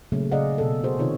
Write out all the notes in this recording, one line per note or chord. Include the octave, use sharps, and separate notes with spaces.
A#2 C#3 F#3 A3 A#3
C#3 G#4 D5 D#5 F5 F#5
B2 A4
F#4 G#4 A#4 C5
C3 D#3 D#4 F4 C#5